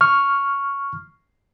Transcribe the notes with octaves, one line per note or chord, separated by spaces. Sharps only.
C#6 F6